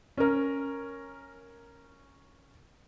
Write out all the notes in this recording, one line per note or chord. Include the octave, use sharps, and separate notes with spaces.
C#4 A#4